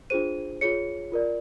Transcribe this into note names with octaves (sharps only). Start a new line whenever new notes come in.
D4 F4 G#4 C5 D#7
F4 G#4 C#5 C#7
F4 A#4 D5